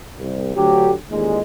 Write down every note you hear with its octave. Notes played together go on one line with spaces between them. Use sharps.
C2
D2 F#3 G4
A1 D#2 A#2 G#3